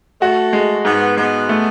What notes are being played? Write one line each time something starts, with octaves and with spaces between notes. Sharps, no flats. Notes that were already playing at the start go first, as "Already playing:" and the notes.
A3 F#4
G#3
G#2 B3
G#3 B3
A3